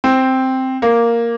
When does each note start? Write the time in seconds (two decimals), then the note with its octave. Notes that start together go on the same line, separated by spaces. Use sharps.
0.04 C4
0.82 A#3